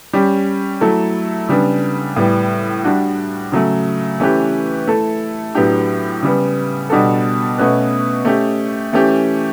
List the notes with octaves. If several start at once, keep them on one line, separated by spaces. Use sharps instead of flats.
G3 C#4 G4
F#3 A3 E4 A4
C#3 G3 B3 D4
A2 G3 B3
G3 D4 F#4
C#3 F#3 A3
E3 A3 C#4 G4 B4
A3 E4 A4
A2 F#3 B3 D4 G4
C#3 G3 B3
B2 G3 D4 F#4 A4
B2 A3 C#4 F#4 B4
A3 C#4 G4
E3 A3 C#4 G4